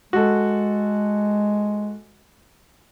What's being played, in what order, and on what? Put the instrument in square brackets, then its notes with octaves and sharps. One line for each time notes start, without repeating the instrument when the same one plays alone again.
[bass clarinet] G#3 [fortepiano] F#4 A4